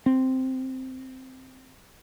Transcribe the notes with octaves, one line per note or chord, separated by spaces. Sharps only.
C4